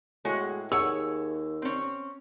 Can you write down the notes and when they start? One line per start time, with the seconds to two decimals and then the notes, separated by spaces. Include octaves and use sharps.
0.25 A2 G#3 F#4 G#4
0.72 D#2 G#4 C#5 F#5 E6
1.62 C4 C#4